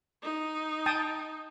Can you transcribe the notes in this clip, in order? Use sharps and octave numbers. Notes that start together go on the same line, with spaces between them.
D#4
G5 A5 D#6